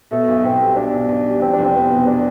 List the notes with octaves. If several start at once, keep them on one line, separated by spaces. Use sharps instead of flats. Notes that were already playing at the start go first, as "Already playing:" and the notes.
B2 A3
B1
B1 C4
G3
B2 D4
B1
B1
G3
E2 C4
D4
F1
C4
B3
B2
D4